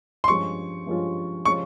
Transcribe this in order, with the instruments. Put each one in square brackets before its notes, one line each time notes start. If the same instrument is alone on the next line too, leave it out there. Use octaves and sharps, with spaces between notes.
[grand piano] C6
[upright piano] G2 F3 G#3 C#4 F4 [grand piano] C#6
[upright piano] G2 F3 G#3 C#4 F4
[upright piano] F3 G#3 C#4 F4 [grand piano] C#6